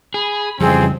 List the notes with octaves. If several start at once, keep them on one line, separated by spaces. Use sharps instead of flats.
G#4 B5
F2 C#3 E3 G3 C4 G#4